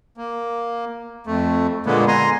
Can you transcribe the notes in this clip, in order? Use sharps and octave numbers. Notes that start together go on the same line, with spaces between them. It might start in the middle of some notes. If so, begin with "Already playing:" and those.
A#3
F2 A3
A#2 D3 G#3 A#3 B3
G#5 A#5 C6